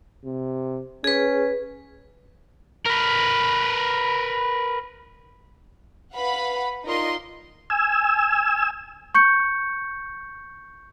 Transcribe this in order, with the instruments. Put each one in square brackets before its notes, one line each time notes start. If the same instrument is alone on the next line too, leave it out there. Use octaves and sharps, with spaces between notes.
[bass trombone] C3
[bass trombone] C#4 [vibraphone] G#4 B4
[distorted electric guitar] A#4 B4
[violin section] B4 F5 F#5 B5
D#4 F4 A#4 D5 D#5 C6
[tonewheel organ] G#5 E6
[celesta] C#6 G6 C#7